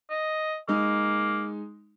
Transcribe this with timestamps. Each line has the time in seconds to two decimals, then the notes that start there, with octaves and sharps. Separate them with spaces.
0.10 D#5
0.68 G#3 A#3 D#4